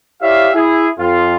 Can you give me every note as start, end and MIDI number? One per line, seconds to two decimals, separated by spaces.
0.22 0.50 64
0.22 0.50 67
0.22 0.50 73
0.22 0.50 74
0.22 0.50 76
0.22 0.50 77
0.54 0.88 64
0.54 0.88 68
0.99 1.36 41
0.99 1.36 65